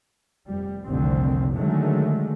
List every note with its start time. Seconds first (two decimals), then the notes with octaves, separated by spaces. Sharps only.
0.47 F1 G3
0.87 F1 C2 D3 D#3 C4
1.55 D3 D#3 F#3 G#3 A3